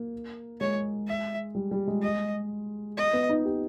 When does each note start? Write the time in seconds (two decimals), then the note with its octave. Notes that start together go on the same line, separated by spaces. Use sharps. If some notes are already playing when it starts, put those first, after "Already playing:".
Already playing: A#3
0.61 G#3 C#5
1.07 E5
1.55 G3
1.71 G3
1.88 G#3
2.02 D#5
2.97 D#5
3.13 B3
3.29 D#4
3.45 G4